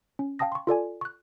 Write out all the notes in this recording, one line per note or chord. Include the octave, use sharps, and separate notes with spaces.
C#4
F5 G5 A5 D#6 A#6
C6 C#6
F4 A4 D5 G#5
C#6 F#6